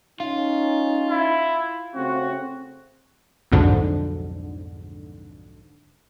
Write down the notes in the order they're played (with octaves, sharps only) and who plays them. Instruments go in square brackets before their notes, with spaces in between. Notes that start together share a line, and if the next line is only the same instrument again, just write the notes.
[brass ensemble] C#4 D#4 [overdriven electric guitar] F4
[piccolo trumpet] E4
[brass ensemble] C#3 A3 C4 [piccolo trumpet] F#4
[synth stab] B1 F2 G#2 D3